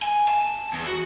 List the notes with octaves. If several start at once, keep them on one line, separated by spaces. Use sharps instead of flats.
G#5
A5
E2
F#4